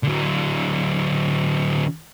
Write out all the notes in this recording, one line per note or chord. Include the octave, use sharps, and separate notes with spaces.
D3 F#3